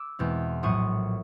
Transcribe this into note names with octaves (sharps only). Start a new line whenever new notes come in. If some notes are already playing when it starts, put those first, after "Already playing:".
Already playing: D6 E6
E2 B2 G#3 C4
A#1 A2 F#3 C#6 D#6